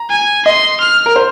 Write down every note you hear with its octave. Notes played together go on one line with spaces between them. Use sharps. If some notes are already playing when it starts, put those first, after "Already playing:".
Already playing: A#5
G#5
D#5 C6
F6
A#4
C5